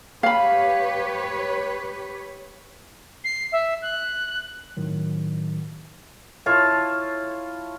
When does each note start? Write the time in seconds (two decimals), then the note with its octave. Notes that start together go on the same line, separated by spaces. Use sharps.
0.23 G4 B4 C#5 F5 B5
3.24 C7
3.52 E5
3.82 F#6
4.77 A2 D#3 F#3
6.46 E4 F4 A4 C#5